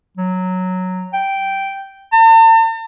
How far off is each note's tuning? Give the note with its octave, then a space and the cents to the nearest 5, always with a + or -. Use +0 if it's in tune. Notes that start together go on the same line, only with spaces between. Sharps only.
F#3 +0
G5 -5
A5 +45